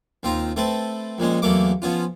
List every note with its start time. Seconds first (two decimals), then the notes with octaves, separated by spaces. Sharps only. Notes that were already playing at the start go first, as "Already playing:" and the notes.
0.23 D#2 C4 F4 A#5
0.56 A3 C4 A4 B4
1.18 F2 A#2 G#3 C#4
1.42 E2 F#3 A3 A#3 C#6 D6
1.82 F3 B3 C#4 F4